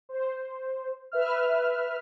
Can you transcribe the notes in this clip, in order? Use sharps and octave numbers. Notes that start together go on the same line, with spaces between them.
C5
B4 E5 F6